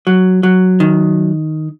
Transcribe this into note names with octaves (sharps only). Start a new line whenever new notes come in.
F#3
F#3
D#3